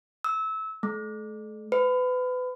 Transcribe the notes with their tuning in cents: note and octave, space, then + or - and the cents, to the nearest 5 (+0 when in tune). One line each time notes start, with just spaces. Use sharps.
E6 -25
A3 -40
B4 +30